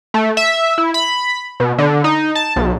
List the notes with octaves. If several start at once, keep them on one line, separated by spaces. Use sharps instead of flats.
A3
E5
E4
B5
B2
D3
D#4
A5
B1